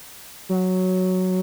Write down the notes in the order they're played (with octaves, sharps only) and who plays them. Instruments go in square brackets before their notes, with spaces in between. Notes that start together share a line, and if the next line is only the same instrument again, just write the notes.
[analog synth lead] F#3